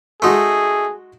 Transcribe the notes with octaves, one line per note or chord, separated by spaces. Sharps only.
G#3 A3 D#4 F#4 G#4 C6